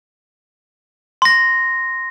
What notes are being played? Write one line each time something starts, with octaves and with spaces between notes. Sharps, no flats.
C6 A#6